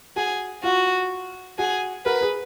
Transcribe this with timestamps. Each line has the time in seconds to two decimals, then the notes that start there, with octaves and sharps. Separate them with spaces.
0.16 F#4 G#4
0.64 F4 F#4
1.58 F#4 G#4
2.05 F#4 A#4 B4
2.21 G#4 B4